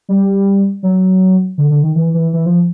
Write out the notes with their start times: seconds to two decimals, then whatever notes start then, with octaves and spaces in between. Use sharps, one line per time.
0.09 G3
0.83 F#3
1.58 D3
1.70 D3
1.83 D#3
1.96 E3
2.14 E3
2.33 E3
2.46 F3